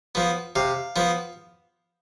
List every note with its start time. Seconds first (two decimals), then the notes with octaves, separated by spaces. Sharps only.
0.15 F3 B3
0.56 C3 F5
0.96 F3 B3